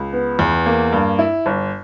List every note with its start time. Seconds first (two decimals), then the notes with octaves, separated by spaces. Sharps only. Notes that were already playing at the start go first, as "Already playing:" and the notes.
Already playing: C#2
0.13 B3
0.39 E2
0.66 A#3
0.92 G2
1.19 E4
1.46 G1